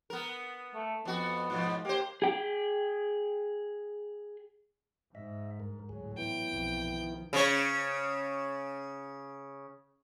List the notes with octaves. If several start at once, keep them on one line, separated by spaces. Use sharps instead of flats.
B3 A#4
A3
F2 B3 F#4
G#2 B2 F3
A#3 G4 C5
G#4 G5
G#2 D#5 E5
G2 A#4
D2 A2 F#3 G#4
E3 B3 E4 G5
B1 F2 B2
D#3 F3
C#3 C#5